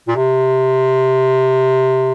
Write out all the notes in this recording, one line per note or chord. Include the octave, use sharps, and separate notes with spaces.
A#2
C3